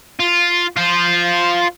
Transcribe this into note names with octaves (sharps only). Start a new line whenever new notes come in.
F4
F4 C5